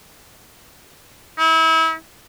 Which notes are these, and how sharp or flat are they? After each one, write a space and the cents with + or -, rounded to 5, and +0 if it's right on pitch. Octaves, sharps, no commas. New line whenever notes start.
E4 -30